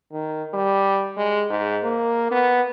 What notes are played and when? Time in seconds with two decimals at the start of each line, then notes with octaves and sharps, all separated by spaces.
0.12 D#3
0.54 G3
1.17 G#3
1.50 G#2
1.83 A#3
2.31 B3